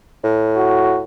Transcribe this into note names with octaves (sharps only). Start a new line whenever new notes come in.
A2
F#4